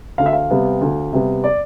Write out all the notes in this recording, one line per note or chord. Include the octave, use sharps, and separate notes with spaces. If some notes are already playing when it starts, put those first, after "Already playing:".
D2 F5
E5
F5
C3 G3 B3
D2
C3 G3 B3
D5